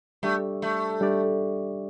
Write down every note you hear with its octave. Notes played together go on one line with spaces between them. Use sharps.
G3 A3 D4 G4 D5
A3
G3 D4 G4 D5